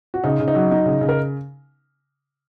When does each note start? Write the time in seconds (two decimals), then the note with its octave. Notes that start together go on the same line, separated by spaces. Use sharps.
0.14 F#4
0.24 C#3 D#4
0.39 C#3
0.48 D#4
0.55 F#3
0.71 D#4
0.86 C#3
1.01 C#3
1.09 A#4